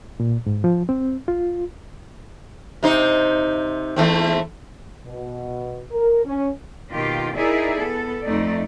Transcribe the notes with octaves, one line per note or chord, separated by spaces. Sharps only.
A#2
G#2
F3
C4
F4
C3 D#4 C5
E2 A3 C4
B2
A#4
C#4
B2 D#3 A#3 F4 G4
D#4 E4 G#4 A#4 D5 E5
B3 A4
F2 A3 D#4 D5